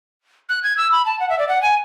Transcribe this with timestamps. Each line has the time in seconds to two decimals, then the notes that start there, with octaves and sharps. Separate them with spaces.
0.49 F#6
0.63 G#6
0.77 E6
0.92 B5
1.06 A5
1.20 F#5
1.30 E5
1.39 D5
1.49 F#5
1.62 G#5